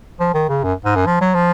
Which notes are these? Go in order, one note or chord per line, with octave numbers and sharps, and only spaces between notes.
F3
D#3
C#3
F#2
G#2
F#2
F3
F#3
F3